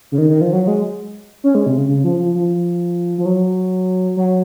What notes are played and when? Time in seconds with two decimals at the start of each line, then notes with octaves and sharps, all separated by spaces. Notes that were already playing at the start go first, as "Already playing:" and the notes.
0.12 C#3
0.18 D#3
0.30 D#3
0.41 F3
0.53 F#3
0.67 G#3
1.44 C#4
1.55 G#3
1.66 C3
1.78 C#3
1.88 C#3
2.04 F3
2.19 F3
2.35 F3
3.18 F3
3.25 F#3
4.17 F#3